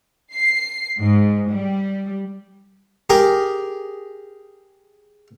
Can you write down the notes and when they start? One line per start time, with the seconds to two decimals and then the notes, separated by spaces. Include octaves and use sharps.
0.33 C7
0.99 G#2
1.51 G3
3.10 G4 G#4 A#4 D6